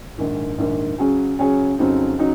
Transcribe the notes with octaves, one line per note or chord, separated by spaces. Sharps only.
A#1 G#2 D#3
A#1 G#2 D#3
C#3 F#3 C#4 G#4
C#3 F#3 C#4 G#4
F2 C#3 F#3 C4 D#4
C#3 F#3 D#4